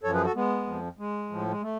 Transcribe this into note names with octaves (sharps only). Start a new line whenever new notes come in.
F#2 F3 A4 C#5
G#4 B4
F#4 A4
G#3 B3
F2 F3
G#3
A2 F3
G#3
A3